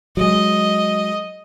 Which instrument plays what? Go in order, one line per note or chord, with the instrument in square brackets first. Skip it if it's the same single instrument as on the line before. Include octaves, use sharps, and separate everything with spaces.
[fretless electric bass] F#3 G#3 [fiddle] D#5